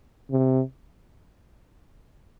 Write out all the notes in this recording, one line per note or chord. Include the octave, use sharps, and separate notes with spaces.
C3